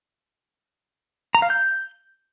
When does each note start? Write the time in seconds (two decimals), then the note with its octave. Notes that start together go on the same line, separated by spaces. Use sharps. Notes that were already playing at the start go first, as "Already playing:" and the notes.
1.35 A#5
1.42 F5
1.50 G6